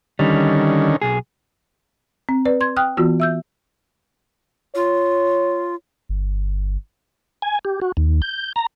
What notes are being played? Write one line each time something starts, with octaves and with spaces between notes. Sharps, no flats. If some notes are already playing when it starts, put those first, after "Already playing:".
D3 D#3 G3 C#4
B1 G#4
C4
B4 D5
C6 G#6
G5 D#6 F6 F#6
E3 B3 F4 F#4
E5 E6 G6
F4 C#5
G1
G#5
G4
F#4
D#2
G6
A#5